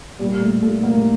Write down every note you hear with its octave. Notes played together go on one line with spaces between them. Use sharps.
A#2 G3
A3
A#2 A3
A#3
A3